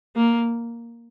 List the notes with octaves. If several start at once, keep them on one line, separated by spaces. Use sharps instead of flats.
A#3